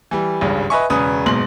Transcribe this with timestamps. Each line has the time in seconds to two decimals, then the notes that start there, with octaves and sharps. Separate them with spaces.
0.11 E3 G3
0.41 G#1 C#2 G2 C#3
0.70 B4 D#5 E5 G#5 C#6
0.90 E1 C#3 C#4 B4 D#6
1.26 F#1 G#2 B2 C6 F#7